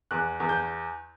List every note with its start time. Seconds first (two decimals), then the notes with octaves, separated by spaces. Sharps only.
0.11 E2 F#6
0.40 E2
0.49 G6